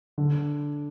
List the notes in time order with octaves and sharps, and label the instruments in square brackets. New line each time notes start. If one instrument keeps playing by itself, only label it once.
[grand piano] D3